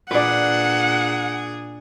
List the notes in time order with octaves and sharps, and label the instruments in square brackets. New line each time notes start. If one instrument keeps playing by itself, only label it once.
[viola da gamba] A#2 D4 G#4 [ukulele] B4 D5 [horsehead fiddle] F#5